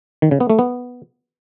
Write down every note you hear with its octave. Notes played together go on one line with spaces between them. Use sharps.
D#3
C#3
B3
A3
B3